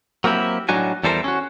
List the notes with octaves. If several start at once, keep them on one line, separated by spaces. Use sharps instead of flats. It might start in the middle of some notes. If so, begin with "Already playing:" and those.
F#3 A#3 C4 E4 G4
A2 F#3 D4 D#4 F#4 G#5
E2 E3 G3 A4 A#4 C5
C#4 F#4